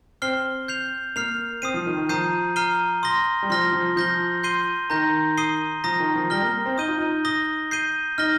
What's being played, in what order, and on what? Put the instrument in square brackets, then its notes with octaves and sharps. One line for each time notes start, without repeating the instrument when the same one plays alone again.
[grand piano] C4 [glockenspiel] F6 C7 G7
[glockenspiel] G6 C7 F7
[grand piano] A#3 [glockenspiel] F6 C7 F7
[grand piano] C4 [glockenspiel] D#6 C7 D#7
[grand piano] F3
D#3
D#3
[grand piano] F3 [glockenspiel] A#5 D#6 G6 C7 D#7
[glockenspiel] A#5 F6 C7 D#7 G7
C6 D#6 A#6 G7
[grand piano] G3
[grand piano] F3 [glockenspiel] C6 F6 A#6 G7
[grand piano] F3
[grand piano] F3 [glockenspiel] G6 A#6 G7
[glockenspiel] C6 G6 C7 D#7 G7
[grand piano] D#3 [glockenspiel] A#5 G6 A#6
[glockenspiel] D#6 C7 D#7 G7
[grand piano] F3 [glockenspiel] A#5 D#6 A#6
[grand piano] D#3
F3
[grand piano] G3 [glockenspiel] F6 A#6 G7
[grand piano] A#3
C4
[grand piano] D#4 [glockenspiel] D#6 G6 D#7 G7
[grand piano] F4
D#4
[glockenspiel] D#6 A#6 G7
G6 C7 D#7 G7
[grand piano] D#4 [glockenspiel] F6 A#6 G7